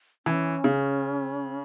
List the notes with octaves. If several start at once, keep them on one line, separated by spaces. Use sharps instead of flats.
E3 C#4
C#3